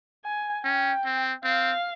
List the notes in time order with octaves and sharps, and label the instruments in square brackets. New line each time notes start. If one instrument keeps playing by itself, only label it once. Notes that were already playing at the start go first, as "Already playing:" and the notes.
[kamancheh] G#5
[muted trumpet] C#4 [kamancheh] G5
[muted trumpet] C4
[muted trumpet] C4 [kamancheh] F5